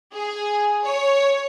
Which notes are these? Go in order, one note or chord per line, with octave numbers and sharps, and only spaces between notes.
G#4
C#5